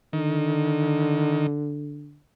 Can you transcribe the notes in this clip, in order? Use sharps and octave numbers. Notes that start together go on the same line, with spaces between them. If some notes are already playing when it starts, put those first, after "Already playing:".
D3 D#3